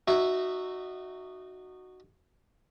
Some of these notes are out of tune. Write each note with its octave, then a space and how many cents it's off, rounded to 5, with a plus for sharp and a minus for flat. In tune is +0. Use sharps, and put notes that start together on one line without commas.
D#4 -30 F#4 +0 E5 +0